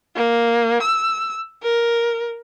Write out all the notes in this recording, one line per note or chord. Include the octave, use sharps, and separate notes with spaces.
A#3
E6
A#4